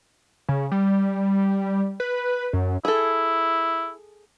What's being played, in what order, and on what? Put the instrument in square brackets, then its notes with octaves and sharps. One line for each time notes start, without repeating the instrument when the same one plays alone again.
[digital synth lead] C#3
G3
B4
F#2
[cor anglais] E4 [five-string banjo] G#4 A4